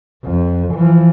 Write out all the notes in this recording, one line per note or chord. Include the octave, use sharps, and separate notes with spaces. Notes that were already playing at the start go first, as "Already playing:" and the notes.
F2
E3 F3